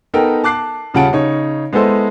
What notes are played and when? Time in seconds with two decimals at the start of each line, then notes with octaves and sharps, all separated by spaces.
0.14 B3 D#4 A4 A#4 G5
0.44 A5 D6 F#6 C7
0.94 D#1 C#3 F4 F#5 A5 D7
1.12 C#3 D#4 C#5
1.73 G#3 B3 E4 A4 C5 D#5